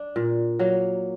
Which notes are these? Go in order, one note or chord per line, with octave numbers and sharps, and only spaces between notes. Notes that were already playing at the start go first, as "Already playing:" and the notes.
Already playing: D4
A#2
F#3 A#3